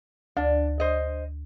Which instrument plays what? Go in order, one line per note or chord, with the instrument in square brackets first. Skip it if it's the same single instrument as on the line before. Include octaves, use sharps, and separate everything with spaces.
[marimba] D2 [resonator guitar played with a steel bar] D4
[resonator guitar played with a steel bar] C5 D#5